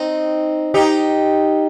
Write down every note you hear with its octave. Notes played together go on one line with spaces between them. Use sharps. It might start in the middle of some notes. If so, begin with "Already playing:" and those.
Already playing: C4 D#4
D#4 G4